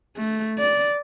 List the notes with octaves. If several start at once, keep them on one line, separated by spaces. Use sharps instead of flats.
A3
D5